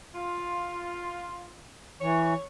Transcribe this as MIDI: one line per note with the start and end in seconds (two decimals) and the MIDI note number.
0.14 1.60 65
2.01 2.34 52
2.01 2.44 73